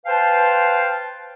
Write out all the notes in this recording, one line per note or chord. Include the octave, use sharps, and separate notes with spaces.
B4 C5 F5 G5 A5